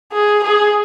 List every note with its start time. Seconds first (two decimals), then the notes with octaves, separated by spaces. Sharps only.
0.13 G#4
0.44 G#4